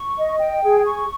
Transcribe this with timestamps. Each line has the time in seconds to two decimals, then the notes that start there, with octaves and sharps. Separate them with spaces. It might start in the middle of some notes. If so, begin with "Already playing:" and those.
Already playing: C#6
0.17 D#5
0.40 G5
0.62 G#4
0.86 C#6